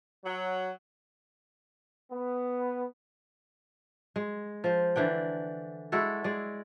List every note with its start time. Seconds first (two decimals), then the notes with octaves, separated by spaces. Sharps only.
0.25 F#3
2.11 B3
4.16 G#3
4.64 F3 C5
4.96 D3 E3 D4 G5
5.92 G#3 E4 F#4 A4
6.24 G#3 D5